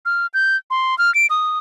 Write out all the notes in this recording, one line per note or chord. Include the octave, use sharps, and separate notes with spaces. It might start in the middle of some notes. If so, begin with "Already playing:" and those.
F6
G6
C6
F6
D7
D#6